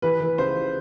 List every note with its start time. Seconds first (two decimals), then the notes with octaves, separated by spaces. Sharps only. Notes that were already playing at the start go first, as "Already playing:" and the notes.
0.02 E3 B4
0.20 E3
0.38 C#2 C5